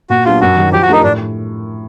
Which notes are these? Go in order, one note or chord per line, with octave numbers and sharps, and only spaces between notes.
A#2 F#4
F#3 B3 D4 F4 G4
F#2 F#4
D#3 F#3
F3 G4
F#4
A3 D4 D#4 G4 A#4
A2 D4